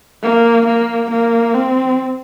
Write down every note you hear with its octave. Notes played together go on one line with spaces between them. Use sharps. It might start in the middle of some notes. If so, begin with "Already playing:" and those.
A#3
A#3
A#3
C4